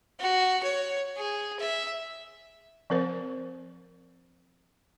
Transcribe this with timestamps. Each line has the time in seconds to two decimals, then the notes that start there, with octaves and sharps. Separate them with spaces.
0.20 F#4
0.63 C#5
1.17 G#4
1.59 E5
2.90 F3 C4 A#4 C5